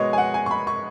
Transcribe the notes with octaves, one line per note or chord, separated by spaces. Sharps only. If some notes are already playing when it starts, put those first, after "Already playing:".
Already playing: B2 G#3 B3 C#5 D#5
G#5
F#5
G#5
C#6
B5
C#6